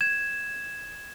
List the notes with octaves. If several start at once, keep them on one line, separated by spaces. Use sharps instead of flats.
G#6 E7